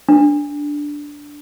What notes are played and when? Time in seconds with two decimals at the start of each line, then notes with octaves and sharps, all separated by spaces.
0.09 D4